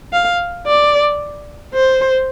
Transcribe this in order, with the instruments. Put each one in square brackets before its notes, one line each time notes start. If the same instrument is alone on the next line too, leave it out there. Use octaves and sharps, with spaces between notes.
[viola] F5
D5
C5